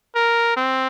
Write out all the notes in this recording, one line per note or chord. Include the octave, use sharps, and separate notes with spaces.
A#4
C4